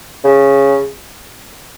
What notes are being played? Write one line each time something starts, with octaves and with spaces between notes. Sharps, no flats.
C#3